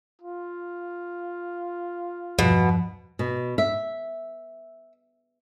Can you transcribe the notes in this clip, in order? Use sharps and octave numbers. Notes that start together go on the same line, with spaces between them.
F4
E2 G2 B2 F3
B2
E5